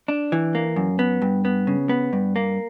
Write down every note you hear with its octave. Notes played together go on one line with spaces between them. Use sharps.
D4
E3
A#3
F#2
B3
G2
B3
C#3
B3
G2
A#3